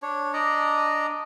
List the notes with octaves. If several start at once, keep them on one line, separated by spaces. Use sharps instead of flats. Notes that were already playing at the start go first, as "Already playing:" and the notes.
D4 C#5
D4 D5 D#5 A#5